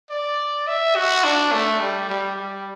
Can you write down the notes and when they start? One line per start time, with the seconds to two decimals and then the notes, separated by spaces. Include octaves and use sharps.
0.10 D5
0.67 E5
0.96 F#4
1.24 D4
1.52 A3
1.80 G3
2.09 G3
2.36 G3